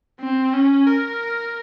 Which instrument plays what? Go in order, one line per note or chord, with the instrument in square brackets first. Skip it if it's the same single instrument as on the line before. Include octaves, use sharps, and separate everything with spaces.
[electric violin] C4
C#4
A#4